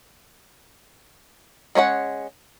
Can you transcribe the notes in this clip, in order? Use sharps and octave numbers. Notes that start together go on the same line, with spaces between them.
G#3 C#4 C#5 F#5